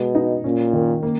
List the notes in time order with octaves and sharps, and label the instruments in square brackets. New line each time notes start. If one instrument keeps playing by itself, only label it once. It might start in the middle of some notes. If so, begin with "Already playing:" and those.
Already playing: [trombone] B2 [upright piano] G#3
[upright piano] D#4
[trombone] A#2 [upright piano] C#4
[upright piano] D#3
A#3